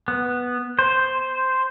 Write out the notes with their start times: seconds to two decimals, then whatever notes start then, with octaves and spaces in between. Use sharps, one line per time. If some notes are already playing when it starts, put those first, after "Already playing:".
0.08 B3
0.79 C5